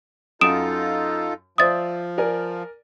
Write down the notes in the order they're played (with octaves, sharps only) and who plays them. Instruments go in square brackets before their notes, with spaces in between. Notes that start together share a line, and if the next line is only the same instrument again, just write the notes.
[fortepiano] F#2 [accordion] D#4 F4 A4 [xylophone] D#6 D7 E7
[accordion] F3 [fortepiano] C5 D5 E5 [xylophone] D#6 A6
[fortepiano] A#4 D5 G#5